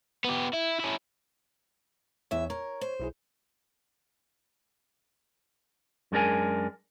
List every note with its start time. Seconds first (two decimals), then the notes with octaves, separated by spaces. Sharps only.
0.24 B3 G4
0.53 E4
0.80 C#4 E4
2.31 E2 E3 C#5 E5
2.50 A#4 C#5
2.81 C5
3.00 B1 E4 G#4
6.12 F#2 G#3 D4 A#4 G#5